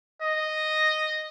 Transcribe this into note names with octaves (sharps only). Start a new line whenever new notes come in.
D#5